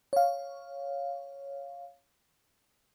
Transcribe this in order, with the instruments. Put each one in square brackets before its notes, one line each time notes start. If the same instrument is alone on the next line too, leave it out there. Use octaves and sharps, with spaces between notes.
[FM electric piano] C#5 F5